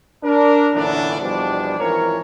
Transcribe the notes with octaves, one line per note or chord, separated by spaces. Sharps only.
D4 A#4
F#2 A#2 D3 E3 B3 D4
E2 B2 F3 G3 D4
G#1 E3 F3 A#4 C#5